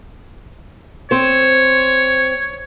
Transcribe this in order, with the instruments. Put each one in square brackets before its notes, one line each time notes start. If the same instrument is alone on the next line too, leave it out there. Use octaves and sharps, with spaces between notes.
[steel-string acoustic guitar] C4 C5 [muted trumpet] C#5